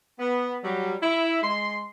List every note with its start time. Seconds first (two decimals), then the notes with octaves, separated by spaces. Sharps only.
0.19 B3
0.63 F#3 G3
1.02 E4
1.42 G#3 C6